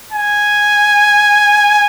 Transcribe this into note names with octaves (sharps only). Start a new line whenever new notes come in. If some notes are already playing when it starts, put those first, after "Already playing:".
G#5